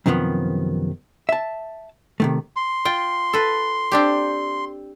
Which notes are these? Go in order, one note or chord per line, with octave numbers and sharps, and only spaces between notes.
F#2 C3 D#3 F3 B3
E5 A5
C3 D#3 A3
C6
F4 G5
A4 B4
C4 D4 G4